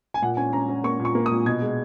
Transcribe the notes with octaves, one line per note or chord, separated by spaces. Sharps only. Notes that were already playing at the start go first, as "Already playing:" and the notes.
G#5
A#2 F#5
C#4 G#5
C#4 A#5
C#4
A#3 C#6
A#2
C#6
A#3
D#6
A#2
B2 G#6
G#3